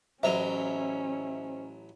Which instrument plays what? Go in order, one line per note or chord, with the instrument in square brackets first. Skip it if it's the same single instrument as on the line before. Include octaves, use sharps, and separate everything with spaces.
[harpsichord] A1 F#3 A#5 [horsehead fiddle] C#4 [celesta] C5 D#5 [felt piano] E5